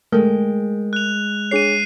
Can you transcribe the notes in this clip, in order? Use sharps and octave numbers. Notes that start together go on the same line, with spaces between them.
G#3 A3 G#4 A#4 G5
F#6 F7
D4 G#4 C#5 C7 D#7